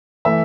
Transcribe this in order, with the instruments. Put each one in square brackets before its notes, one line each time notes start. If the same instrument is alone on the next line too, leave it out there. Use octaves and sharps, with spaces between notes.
[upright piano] E3 A3 E5